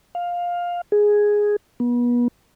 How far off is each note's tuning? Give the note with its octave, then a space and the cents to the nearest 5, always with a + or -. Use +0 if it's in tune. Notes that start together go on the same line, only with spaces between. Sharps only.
F5 +10
G#4 +0
B3 -35